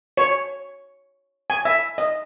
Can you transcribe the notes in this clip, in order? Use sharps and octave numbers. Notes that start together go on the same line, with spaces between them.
C#5
G#5
E5
D#5